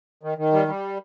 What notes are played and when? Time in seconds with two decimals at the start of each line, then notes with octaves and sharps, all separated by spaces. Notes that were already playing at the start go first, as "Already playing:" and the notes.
0.23 D#3
0.38 D#3
0.53 G3
0.68 G3